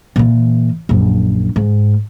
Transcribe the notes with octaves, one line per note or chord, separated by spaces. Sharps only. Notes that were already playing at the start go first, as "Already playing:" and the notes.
A#2 E3
A#1 F#2
G#2